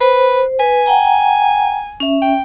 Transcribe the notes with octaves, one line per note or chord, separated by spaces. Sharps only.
B4 C5
B4 G#5
F#5 G5 A#5
C#4 E5
G5